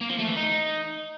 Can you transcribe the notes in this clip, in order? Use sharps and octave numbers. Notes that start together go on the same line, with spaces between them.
A#3
F3
A3
E3
D#4